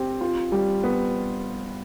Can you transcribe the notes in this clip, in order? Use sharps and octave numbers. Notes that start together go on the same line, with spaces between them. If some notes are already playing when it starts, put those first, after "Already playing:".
Already playing: C4 G4
F4
G3
B3